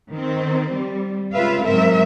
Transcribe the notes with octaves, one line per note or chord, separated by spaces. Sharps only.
D#3 C4
G3
C#3 G#3 F4 B4 E5 F5
G#2 F#3 G#3 C4 A#4 E5